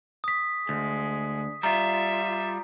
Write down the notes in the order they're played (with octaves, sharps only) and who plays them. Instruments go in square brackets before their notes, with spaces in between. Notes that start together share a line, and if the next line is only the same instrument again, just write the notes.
[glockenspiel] D#6 B6
[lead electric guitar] D2 [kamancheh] G#3
[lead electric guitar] G3 F4 [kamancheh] E5 [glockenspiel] A#5